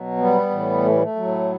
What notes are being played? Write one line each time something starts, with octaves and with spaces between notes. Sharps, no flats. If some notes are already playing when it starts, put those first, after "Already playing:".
Already playing: B2 F#3
G3 B3
A2 E3
A3
G3
A3
A2 F#3